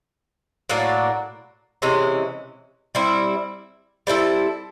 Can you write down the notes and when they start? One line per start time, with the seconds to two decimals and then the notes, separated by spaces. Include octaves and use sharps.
0.70 A2 F#3 A#3 D4
1.82 C3 E3 G#3 C#4
2.95 G3 C4 E4
4.07 G3 C4 E4 A4